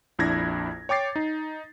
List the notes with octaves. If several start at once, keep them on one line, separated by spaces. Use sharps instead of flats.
A#1 F2 D4 E4 G#6 A#6
C#5 G5 D6 A6 C7
D#4